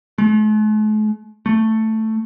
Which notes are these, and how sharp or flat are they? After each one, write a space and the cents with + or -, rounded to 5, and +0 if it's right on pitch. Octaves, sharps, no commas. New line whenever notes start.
A3 -45
A3 +5